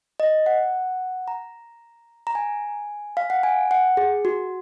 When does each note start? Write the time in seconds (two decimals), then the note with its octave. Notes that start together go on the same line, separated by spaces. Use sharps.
0.20 D#5
0.46 F#5
1.28 A#5
2.27 A#5
2.35 G#5
3.17 F5
3.30 F#5
3.43 G#5
3.71 F#5
3.97 G#4
4.25 F#4